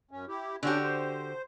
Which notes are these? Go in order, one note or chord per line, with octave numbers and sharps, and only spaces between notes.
F#2 C#4
E4 G4
D3 C#4 D4 F#4 G4
C5